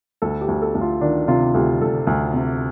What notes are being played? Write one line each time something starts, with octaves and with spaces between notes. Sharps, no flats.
D2 A4
G4
D2
A4
D2
F4
D#3 D4
C3 F4
D2 G4
D2 A4
D2
C3